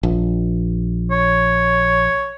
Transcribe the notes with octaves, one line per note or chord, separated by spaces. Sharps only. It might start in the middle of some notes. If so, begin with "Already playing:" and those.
A#1
C#5